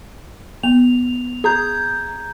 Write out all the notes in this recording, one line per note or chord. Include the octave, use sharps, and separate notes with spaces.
B3 F7
G#4 A#5 G6